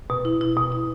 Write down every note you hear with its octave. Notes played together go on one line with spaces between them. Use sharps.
B2
E4
E4
B2
E4